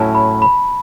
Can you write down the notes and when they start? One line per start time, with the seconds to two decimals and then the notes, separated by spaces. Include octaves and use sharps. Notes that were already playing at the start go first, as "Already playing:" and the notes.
Already playing: A2 F#3 C#4 E4 A5
0.15 B5
0.42 B5